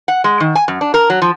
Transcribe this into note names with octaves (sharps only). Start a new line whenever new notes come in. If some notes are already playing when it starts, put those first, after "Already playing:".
F#5
G#3
D#3
G#5
F#2
D4
A#4
F#3
F3